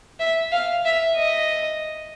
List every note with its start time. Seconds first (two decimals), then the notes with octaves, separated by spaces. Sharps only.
0.20 E5
0.52 F5
0.85 E5
1.16 D#5